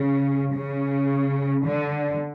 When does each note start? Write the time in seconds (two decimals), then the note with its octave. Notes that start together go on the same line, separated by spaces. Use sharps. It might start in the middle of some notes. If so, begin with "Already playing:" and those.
Already playing: C#3
0.55 C#3
1.65 D3